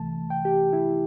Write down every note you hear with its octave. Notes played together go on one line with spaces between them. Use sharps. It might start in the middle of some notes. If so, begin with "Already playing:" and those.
Already playing: C2 C3 E3 A3 A5
G5
G4
E4